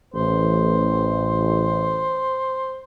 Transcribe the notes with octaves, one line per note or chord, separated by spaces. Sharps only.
A1 C5